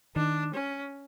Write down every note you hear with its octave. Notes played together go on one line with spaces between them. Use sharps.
D#3 D4
C#4